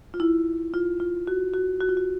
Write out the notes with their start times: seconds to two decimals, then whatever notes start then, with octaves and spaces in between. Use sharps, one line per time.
0.14 F4
0.20 E4
0.74 F4
1.00 F4
1.27 F#4
1.54 F#4
1.81 F#4
1.89 F4
1.97 F#4